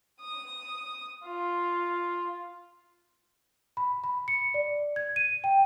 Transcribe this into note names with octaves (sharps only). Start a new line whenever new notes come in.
D#6
F4
B5
B5
C#7
D5
G#6
D#7
G5